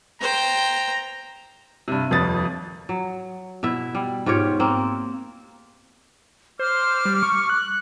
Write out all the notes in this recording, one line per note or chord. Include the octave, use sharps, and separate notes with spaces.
C5 G5 A#5
G2 C3
D#1 F2 B4 D#6 A6
F#3
B2 E4 E5
G3
G#2 F4 G4 C#5
A#3 C4
C5 D6 F6
G3
C#6
F#6